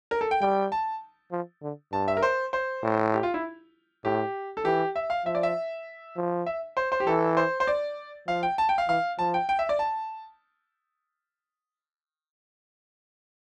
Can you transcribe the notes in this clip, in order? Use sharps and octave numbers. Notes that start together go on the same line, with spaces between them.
A#4
A4
G5
G3 G5
A5
F3
D3
G2 A5
E5
A#4
C5
C5
A2
G4
F4
E4
A2 G4
A4
E3 G4
E5
F5
F3 E5
D5
E5
F3
E5
C5
C5
G4
E3 A4
C5
C5
D5
F3 F5
G5
A5
G5
F5
E3 F5
F3 A5
G5
G5
E5
D5
A5